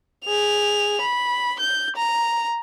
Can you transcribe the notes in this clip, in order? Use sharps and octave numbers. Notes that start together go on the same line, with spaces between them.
G#4 F7
B5
G6
A#5